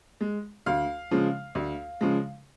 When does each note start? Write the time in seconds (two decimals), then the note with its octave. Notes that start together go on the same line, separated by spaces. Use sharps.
0.21 G#3
0.66 D2 F5
1.11 C#3 F3 G#3
1.55 D2
2.01 C#3 F3 G#3